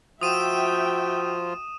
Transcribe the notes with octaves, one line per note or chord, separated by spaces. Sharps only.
F3 F4 F#4 E5 G5 D#6 D#7 E7